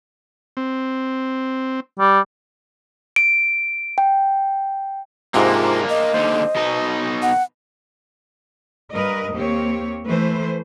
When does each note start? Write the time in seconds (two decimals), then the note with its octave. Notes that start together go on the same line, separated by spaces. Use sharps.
0.57 C4
1.99 G3
3.16 D7
3.98 G5
5.34 G#2 C3 A#3 D4 F4
5.89 D#5
6.14 D#2 D3 C5
6.56 B2 D#4
7.22 F#5
8.94 G2 A#4 B4 D#5
9.33 D#2 A#3 C4 G4 C#5
10.05 E3 A3 B4 C5